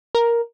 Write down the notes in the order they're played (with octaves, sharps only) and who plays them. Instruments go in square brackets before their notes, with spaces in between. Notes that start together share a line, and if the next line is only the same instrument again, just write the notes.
[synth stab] A#4